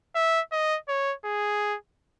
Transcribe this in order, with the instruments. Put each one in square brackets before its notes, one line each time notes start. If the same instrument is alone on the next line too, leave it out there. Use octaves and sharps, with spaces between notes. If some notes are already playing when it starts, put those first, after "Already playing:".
[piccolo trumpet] E5
D#5
C#5
G#4